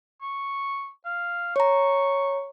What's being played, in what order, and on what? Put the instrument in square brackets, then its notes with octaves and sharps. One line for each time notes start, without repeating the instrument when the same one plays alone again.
[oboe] C#6
F5
[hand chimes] C#5 A#5 [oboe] C#6